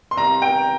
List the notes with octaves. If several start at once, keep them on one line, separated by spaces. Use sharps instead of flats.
C6
C2 A#5
G5